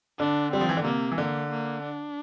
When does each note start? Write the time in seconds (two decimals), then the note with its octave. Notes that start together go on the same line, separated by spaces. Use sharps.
0.19 D3 D4
0.52 G3 C4
0.61 F3
0.69 E3
0.77 D3
0.84 C3 A#3
1.12 E3
1.18 D3 A#3
1.51 A#3
1.83 D4